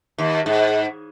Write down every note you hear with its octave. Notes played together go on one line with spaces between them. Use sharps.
D#2
G#2